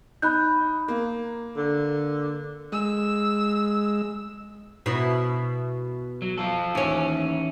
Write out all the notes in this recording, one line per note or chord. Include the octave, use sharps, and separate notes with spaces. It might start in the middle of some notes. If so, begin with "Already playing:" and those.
D#4 B5 F#6 G6
A#3
D3
G#3 E6
B2 E4
F#3
F3 F4 A4
D#2 E3 C#4 C#5